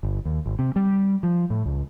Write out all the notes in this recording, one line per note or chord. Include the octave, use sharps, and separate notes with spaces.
G1
D#2
G#1
C3
G3
F3
A2
C#2